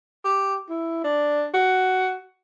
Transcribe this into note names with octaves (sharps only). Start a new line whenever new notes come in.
G4
E4
D4
F#4